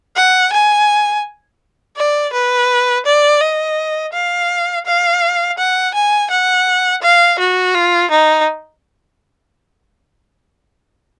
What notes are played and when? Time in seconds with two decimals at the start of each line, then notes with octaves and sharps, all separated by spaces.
0.16 F#5
0.53 G#5
1.97 D5
2.33 B4
3.05 D5
3.41 D#5
4.13 F5
4.86 F5
5.58 F#5
5.94 G#5
6.30 F#5
7.02 F5
7.39 F#4
7.74 F4
8.10 D#4